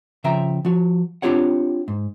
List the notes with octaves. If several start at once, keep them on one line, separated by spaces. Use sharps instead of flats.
C#3 F3 E5 G5 A#5
F3 F#4
C4 D4 F4 G4 C#5 F#5
G#2